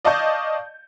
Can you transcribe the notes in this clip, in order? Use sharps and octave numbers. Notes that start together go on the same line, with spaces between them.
D5 D#5 F5 A5 C#6 G6